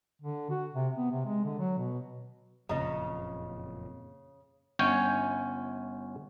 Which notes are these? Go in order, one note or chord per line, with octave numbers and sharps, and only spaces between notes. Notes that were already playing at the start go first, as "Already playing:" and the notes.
D3
F#4
C3
B3
C3
G#3
D3
F#3
B2
F#1 F2 A#2 C#3 D#5 A#5
G1 C#4 C#5 G5 G#5